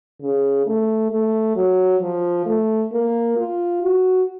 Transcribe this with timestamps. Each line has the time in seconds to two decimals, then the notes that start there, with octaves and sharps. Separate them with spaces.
0.21 C#3
0.66 A3
1.11 A3
1.56 F#3
2.02 F3
2.46 A3
2.92 A#3
3.37 F4
3.82 F#4